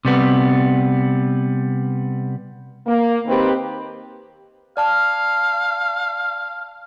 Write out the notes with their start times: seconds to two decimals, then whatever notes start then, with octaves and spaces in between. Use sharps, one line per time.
0.05 C3 G3 B3
2.87 A#3
3.27 D#3 C4 G4 B4
4.77 D5 F5 A5 F6